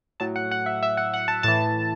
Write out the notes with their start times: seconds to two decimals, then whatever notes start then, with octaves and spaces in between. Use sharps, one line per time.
0.20 A2 F#3 A5
0.36 F#5
0.51 F#5
0.66 E5
0.83 E5
0.97 F#5
1.14 F#5
1.28 A5
1.43 A2 E3 A5